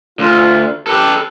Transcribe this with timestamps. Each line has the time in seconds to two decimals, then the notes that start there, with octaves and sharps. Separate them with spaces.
0.19 D2 F4
0.87 G4 A4 B4